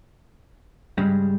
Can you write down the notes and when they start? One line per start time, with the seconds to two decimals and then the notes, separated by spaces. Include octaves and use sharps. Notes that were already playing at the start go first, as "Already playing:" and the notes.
0.98 G2 C#3 G3 G#3